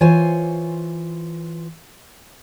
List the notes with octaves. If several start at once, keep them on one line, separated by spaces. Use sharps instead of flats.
E3 F4 C5 C#5 G#5